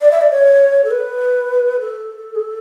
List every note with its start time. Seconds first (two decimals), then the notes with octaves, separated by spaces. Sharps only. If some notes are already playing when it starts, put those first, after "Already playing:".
0.01 D5
0.11 E5
0.21 D5
0.31 C#5
0.84 A4
0.91 B4
1.80 A4
2.35 G#4
2.39 A4